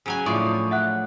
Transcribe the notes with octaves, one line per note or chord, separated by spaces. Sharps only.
C#3 F#3 G#5
A2 F3 D4 D5 C#6 D#6
E5 F#5 F#6